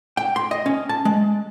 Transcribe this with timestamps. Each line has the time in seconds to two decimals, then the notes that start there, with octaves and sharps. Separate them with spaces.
0.17 G5
0.36 C6
0.51 D#5
0.66 C#4
0.89 A5
1.05 G#3